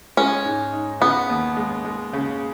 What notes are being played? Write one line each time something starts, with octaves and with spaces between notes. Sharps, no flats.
G#3 C#4
G#2
D#4
C#3 B3
D#2
G#3
G#3
C#3